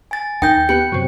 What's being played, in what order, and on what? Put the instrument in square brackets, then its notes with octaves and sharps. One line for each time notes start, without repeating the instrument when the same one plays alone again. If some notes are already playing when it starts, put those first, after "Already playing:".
[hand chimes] G#5 A6
[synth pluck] D#2 A#6 [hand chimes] G5 G6
[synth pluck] B3 G4 [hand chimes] C#7
[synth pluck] F#2 C3